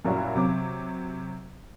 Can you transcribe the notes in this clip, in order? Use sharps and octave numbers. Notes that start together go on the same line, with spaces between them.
F#2 A#2 F#3 G3 E4 F#4
C3 F#3 D6